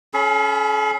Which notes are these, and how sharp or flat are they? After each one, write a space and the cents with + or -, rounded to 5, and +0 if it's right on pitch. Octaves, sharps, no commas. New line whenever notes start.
C#4 +5 A4 -45 B5 +0